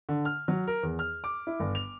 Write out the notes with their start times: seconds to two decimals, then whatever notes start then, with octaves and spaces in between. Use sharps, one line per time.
0.09 D3
0.25 F6
0.48 F#3
0.67 A#4
0.83 E2
0.99 F6
1.24 D6
1.47 E4
1.60 G1
1.75 F7